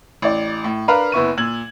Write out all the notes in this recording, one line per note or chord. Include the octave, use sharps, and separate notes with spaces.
A1 D5
A2
D4 A#4 B4 F5 A#5 B5
F#1 B3 E4 C#6 D#7
A#2 E6 G#6 F#7